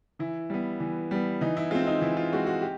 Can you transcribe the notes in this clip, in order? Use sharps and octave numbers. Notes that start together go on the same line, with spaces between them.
E3 E4
G3 B3
E3
G3 B3
E3 D#4
E4
G#3 C4 F4
D#4
E3 E4
F4
G#3 C4 F#4
F#4
G4